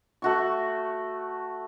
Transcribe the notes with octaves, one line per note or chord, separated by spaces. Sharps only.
A3 F#4 C#6